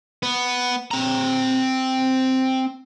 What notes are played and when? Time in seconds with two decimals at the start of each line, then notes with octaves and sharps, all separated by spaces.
0.23 B3
0.91 C4 A#5